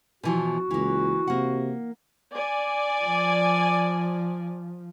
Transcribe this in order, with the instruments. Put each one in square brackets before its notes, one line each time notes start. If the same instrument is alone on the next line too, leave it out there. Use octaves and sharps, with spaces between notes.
[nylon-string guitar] B2 E3 F3 [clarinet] F#4
[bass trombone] C#2 [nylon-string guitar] E3 A#3
[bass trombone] C3 [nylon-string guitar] A#3 F#5
[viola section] D5 G#5
[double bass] F3